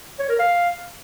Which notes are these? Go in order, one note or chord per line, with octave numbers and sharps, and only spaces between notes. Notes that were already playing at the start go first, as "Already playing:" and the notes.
C#5
A#4
F5